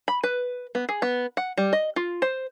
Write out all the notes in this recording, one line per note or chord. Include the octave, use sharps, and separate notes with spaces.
B5
B4
B3
G#4
B3
F#5
G3
D#5
F4
C5